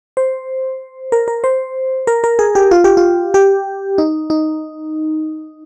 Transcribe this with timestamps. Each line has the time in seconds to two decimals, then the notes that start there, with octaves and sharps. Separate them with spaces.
0.17 C5
1.12 A#4
1.28 A#4
1.44 C5
2.07 A#4
2.24 A#4
2.39 G#4
2.55 G4
2.71 F4
2.84 G4
2.97 F4
3.34 G4
3.98 D#4
4.30 D#4